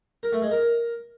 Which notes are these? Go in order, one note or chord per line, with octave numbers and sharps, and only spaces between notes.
A#4
A3
G#3
A#4